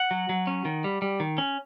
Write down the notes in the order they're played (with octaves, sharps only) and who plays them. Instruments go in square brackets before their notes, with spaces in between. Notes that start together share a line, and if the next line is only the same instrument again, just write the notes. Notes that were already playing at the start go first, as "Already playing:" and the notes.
Already playing: [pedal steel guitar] F#5
F#3
F#3
C#4
D#3
G3
G3
D#3
C#4